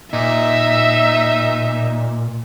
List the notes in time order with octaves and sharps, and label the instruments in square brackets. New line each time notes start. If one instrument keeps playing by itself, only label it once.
[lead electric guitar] A#2 [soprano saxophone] D#4 [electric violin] E5